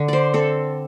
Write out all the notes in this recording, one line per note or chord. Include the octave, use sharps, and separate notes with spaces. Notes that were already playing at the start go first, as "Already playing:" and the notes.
Already playing: D3
C5 D5
C4 A4